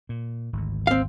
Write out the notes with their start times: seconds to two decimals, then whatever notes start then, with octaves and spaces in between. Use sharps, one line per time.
0.09 A#2
0.53 G#1 D2
0.87 C4 F5